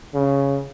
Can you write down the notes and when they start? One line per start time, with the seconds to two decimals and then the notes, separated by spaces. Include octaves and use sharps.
0.14 C#3